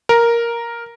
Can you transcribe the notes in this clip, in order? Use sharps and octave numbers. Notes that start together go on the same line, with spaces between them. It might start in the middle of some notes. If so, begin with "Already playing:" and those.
A#4